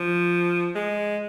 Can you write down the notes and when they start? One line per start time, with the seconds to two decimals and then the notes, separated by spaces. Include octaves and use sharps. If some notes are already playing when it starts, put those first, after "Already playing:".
Already playing: F3
0.75 G#3